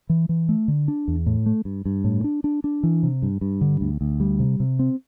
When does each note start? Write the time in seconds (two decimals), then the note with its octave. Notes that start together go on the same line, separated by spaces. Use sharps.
0.09 E3
0.29 E3
0.49 A3
0.68 D3
0.88 D4
1.08 E2
1.26 A2
1.46 A3
1.65 G2
1.85 G2
2.04 A2
2.24 D4
2.44 D4
2.64 D4
2.83 E3
3.03 C3
3.22 G2
3.41 G2
3.61 D3
3.81 D2
4.01 D2
4.20 G3
4.40 C3
4.60 C3
4.79 C4